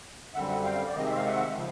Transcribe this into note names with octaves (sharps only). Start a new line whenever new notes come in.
F#2 D3 G3 C4 E5 F#5
E5 F#5
F5 G5
D5
C3 D#3 G#3 C4 D#5
E5
F5
E5 F#5
C#3 F3